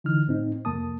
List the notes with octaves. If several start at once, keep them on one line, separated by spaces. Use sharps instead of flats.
D3 E3 D#4 F6
A2 C4 D#4
C2 F2 A#3 A5 D#6